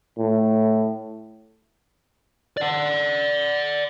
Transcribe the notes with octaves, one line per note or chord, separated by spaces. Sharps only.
A2
D5 F#5